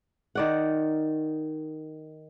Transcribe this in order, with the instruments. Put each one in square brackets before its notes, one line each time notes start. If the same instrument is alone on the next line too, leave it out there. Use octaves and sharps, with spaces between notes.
[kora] D#3 D5 F#5